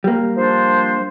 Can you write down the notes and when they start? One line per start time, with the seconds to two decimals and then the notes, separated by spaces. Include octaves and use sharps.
0.04 G3 A#3
0.37 F3 D4 C5